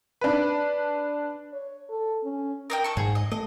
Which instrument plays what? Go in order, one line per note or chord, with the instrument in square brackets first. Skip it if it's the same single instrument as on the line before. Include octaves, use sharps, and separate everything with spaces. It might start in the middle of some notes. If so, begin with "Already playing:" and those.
[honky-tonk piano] D4 B4
[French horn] C#5
A4
C#4
[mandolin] A#4 D#5 G5
A4 C#6
[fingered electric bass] G#2 [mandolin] G#4
[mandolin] D#5
[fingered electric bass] A3 [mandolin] D#5